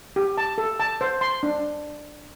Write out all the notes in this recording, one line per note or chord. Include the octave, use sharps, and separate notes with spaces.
G4
A5
A4
A5
C5
C6
D4